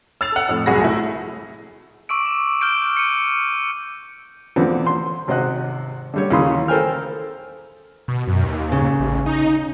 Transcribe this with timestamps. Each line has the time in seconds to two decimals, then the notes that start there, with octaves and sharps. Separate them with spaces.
0.21 E6 A6 F7
0.32 A4 F#5
0.49 F2 A2
0.66 F#1 C2 F#4 G#4 B5 A#6
0.81 A3 E4
2.09 C#6 D6 E6 D7
2.26 E7
2.61 F6 G6 D7
2.97 C#7 D#7
4.56 E2 D3 F3 B3 C4
4.86 C6
5.28 G#1 C3 C5 D#5 F#5 F#6
6.14 D3 G3 C#5
6.30 D#2 C#3 E3 B5 C6 D#6
6.68 A4 A#4 C5 G5 G#5 F6
8.08 B2
8.27 F#2
8.43 D#2
8.72 C#3
9.00 A1
9.26 D#4